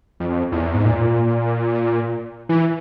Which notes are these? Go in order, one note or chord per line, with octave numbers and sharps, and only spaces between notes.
F2
E2
G#2
A#2
E3